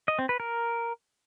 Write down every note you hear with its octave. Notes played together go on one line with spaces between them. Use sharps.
D#5
C4
B4
A#4